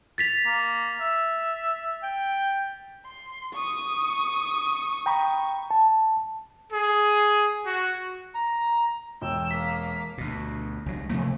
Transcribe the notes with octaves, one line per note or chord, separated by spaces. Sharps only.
A6 B6 F7
A#3
E5
G5
C6
C#6 D#6
G5 A#5 B5
A5
G#4
F#4
A#5
E1 G5 E6
A#3 B6
D2 B2
C#2 F#3
C3 F3 A3 A#3